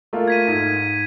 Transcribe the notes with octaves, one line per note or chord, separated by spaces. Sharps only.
A3 A#3 F4
G#6 B6 D#7
G#2